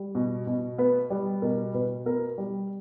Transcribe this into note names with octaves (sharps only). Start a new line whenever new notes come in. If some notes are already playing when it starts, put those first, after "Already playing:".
Already playing: G3
B2
B2
B3 B4
G3
B2 A#4
B2 B4
B3 A#4
G3